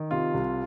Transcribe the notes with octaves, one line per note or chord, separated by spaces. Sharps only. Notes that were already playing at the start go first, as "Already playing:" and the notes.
Already playing: D#3
C3 F4
C2